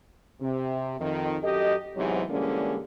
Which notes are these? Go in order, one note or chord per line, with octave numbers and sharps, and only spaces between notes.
C3
F2 D#3
F#2 G4 A4 D#5
E2 G#2 C3 E3 F#3
D3 E3 G3 G#3 A#3 C#4